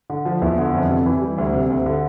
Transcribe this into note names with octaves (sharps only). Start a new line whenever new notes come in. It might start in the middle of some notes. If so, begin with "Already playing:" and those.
D3
F3
E2
D3
F2
C3
E3
G3
D2
C3
D2
D3